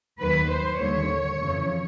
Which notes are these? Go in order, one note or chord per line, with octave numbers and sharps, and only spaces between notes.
D#2 D#3 F#3 B4
C5
D#2 D3 G3 C#5
F2 C#3 E3